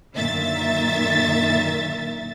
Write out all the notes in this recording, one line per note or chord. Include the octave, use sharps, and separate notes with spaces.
F#2 A#2 D3 D#3 E5 A6